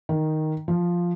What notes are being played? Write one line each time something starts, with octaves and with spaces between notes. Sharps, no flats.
D#3
F3